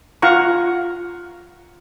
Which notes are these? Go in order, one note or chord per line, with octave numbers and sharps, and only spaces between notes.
F4 F5 F#5 A#5 C#6